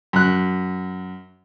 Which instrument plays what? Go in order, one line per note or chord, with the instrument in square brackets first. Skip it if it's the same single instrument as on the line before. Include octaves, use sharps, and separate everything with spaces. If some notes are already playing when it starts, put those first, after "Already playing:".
[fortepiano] F#2 F#6